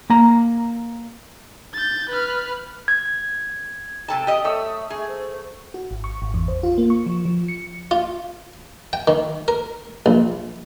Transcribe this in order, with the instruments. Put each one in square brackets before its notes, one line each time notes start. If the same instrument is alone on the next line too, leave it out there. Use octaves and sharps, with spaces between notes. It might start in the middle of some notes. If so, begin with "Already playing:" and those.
[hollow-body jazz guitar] A#3 A#5
[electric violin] G6 A6
B4 F6
[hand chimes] G#6
[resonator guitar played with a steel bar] C3 A4 A5 [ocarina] G5
[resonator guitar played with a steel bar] G4 D#5
[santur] A3 D#6 E6 [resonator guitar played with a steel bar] C#5 [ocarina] E5
[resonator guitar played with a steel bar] G#4
[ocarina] C5
[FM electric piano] F#4
G#1
C#6
G#1
E2
C5
F4
A#3
C#6
F3
F3
C#7
[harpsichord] F4
G5
D#3
A#4
A#1